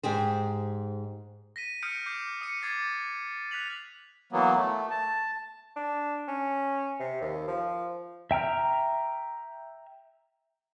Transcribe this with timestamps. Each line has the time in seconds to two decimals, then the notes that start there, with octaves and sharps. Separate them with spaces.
0.03 G#2 G4 G#4 C5
1.56 A#6 B6 D#7
1.82 D#6 F6 G6 C#7 D7
2.06 D6 G6 C7
2.41 D#6 C#7 D#7
2.62 D6 G#6 A6 C7
3.51 F#6 B6 F7 F#7
4.32 E3 F#3 A#3 B3
4.56 A3
4.90 A5
5.76 D4
6.28 C#4
6.99 C3
7.21 D#2
7.48 F3
8.31 E5 G5 A#5 F6